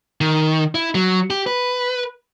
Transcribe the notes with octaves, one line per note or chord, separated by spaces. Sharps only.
D#3
E4
F#3
G4
B4